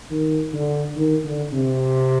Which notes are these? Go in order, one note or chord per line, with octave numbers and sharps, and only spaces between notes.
D#3
D3
D#3
D3
C3